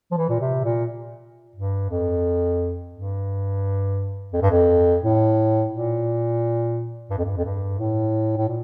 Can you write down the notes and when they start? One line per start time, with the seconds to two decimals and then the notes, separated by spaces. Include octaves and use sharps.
0.11 F3
0.17 E3
0.29 A#2
0.40 C3
0.64 A#2
1.56 G2
1.90 F2
2.94 G2
4.33 F2
4.42 G2
4.51 F2
5.02 A2
5.71 A#2
7.10 G2
7.17 F2
7.25 G2
7.37 F2
7.45 G2
7.79 A2
8.37 A2
8.48 A#2